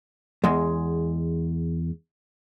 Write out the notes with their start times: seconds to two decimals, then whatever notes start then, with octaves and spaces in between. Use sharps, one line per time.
0.44 E2 G#3